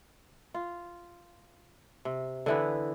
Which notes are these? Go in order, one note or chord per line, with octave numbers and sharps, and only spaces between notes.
F4
C3
D3 E3 B3